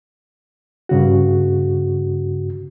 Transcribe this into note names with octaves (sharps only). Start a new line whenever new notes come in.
G2 C#3 F#4